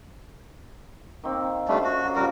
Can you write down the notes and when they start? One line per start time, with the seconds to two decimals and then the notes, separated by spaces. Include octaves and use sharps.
1.23 D#3 A#3 C4
1.68 G3 A3 C#4 D4 F4 C5
1.84 F#4
2.03 D3 F#3 A4
2.16 A#2 C#3 F3 G3 F#4 A#4